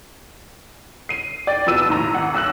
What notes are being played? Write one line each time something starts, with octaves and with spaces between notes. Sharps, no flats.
C7 D#7
D5 G5 A6
F1 B2 F3 E6 D#7
D#2 A2 A#5
G#1 F#5
B1 E6 F#6 F#7